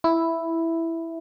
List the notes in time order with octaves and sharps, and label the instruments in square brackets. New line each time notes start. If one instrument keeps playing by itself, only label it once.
[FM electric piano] E4